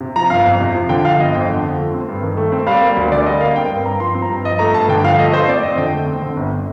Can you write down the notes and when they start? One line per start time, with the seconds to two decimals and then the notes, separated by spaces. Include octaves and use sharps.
0.01 C3
0.16 F3 A#5
0.30 G1 F5
0.46 F2
0.61 C3
0.75 F3
0.89 D3 G5
1.05 F3 F5
1.19 G1 D#5
1.34 F2 G5
1.49 D3
1.64 F3
1.78 A3
1.94 C4
2.09 G2
2.22 D#3
2.37 A3
2.52 C4
2.67 G3 F5
2.82 A#3
2.97 D2
3.12 D3 D5
3.26 G3 D#5
3.41 A#3 F5
3.56 C4 G5
3.70 G2
3.85 G2 A#5
4.00 F3 C6
4.15 C4
4.22 A#5
4.30 G2
4.44 F3 D#5
4.59 A3 A#5
4.74 G2 A5
4.88 D3 G5
5.04 F3 F5
5.19 A3 D#5
5.34 A3 C5
5.48 C4 D5
5.63 F2 D#5
5.77 D3 G5
5.93 A3
6.07 C4
6.22 D3
6.37 G1